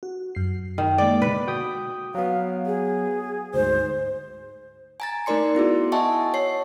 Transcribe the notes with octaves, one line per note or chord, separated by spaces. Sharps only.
F#4
F#2 C7
D#3
G#3 A#3 D5
B2 D3 B4
F#4 G5 D#6
F#3 B3 F5
G#4
D2 G#2 C5
G#5 A#5 A6
A3 D#4 A#4 D5 C6 C#7
B3 E4 F#4 G#4
D#5 E5 F#5 G#5 A5 C#6
C#5 C7